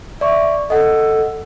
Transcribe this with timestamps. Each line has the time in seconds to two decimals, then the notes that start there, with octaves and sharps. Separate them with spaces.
0.21 D5 E5 C#6
0.70 A4 D#5 F#5